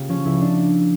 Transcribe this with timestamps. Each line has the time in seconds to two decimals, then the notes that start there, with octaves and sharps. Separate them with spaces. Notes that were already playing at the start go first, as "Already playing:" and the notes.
Already playing: C#3 A#3 F4 G4
0.09 F3 C#4
0.25 C#2 E4
0.41 D4